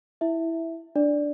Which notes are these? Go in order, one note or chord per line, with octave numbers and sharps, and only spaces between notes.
E4 E5
D4 D5